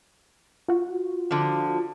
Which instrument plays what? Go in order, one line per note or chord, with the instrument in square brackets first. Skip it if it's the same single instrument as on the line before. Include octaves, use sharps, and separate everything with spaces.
[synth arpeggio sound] F4 F#4
[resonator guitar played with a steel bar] D3 F3